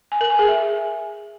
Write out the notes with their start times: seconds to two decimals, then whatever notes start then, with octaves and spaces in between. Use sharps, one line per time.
0.12 G#5
0.21 A#4
0.30 G#5
0.39 G#4
0.48 E5